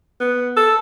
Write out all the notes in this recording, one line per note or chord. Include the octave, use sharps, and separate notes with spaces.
B3
A4